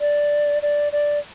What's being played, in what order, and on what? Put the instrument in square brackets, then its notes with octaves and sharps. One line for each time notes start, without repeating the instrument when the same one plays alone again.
[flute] D5
D5
D5